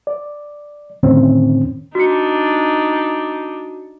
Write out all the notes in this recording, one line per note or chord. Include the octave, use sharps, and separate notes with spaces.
D5
E2 A2 D3 D#3 C4 C#4
D4 D#4 F#4 C#7